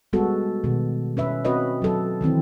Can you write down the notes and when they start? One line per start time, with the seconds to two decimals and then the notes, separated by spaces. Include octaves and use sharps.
0.13 G3 G#3 B3 F#4 A4
0.64 B2 D#3 B3
1.17 C#4 B4 E5
1.45 C4 C#4 F#4 B4 C#5 D#5
1.82 F#3 A4
2.21 D#3 E3 C4 E4